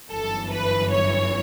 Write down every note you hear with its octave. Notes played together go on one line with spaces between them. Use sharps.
G1 F#2 E3 A4
B4
C#5